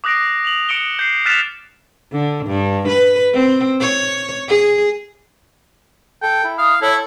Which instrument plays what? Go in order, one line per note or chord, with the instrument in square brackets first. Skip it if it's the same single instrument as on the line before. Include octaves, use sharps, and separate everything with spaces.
[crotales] D6 D#6 F#6 A#6 C7 D7
F7 F#7
D#6 C#7 D7 E7 G7
G6 C7
F6 F#6 A6 B6 E7 F7
[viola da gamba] D3
G2
B4
C4
C#5
G#4
[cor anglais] A4 [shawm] G5
[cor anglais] E4
[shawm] F5 [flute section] D#6
[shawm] E4 [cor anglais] A4 [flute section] C#5